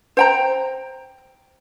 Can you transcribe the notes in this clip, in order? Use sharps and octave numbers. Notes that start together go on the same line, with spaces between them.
C5 G5 A#5